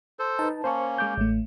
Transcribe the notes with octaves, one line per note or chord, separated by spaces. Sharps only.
A4 C5
D#4 B4 A5
A#3 C#4 C5 C#6
G#3 D6 G6
A1 A3